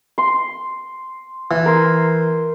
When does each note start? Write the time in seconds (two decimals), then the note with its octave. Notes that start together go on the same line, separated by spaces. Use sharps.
0.18 C6
1.51 E3
1.66 A#4 C5